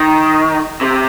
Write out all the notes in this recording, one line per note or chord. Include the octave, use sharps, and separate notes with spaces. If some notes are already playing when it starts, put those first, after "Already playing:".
Already playing: D#3
C3